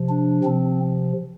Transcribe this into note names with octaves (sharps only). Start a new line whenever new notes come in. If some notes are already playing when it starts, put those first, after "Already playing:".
Already playing: C3 F3
D4
C3 F3 C4